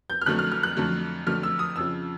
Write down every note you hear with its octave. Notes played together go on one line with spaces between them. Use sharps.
G6
F6
F2 D3 F#3 A3 F#6
F6
F6
F#6
F2 D3 F#3 A3
F2 D3 F#3 A3 F6
E6
D#6
F2 C#3 F3 E6